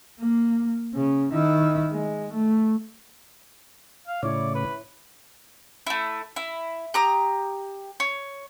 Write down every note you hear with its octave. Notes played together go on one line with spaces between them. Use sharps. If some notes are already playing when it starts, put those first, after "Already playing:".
A#3
C#3
D#3 E4
G#3
A3
F5
A2 C#3 E4 C#5 D5
B4
A3 E4
E4
G4 A#5 D#6
C#5